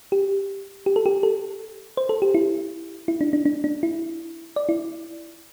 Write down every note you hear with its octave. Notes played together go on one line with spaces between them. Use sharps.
G4
G4
A4
G4
A4
C5
A4
G4
E4
E4
D4
D4
D4
D4
E4
D5
E4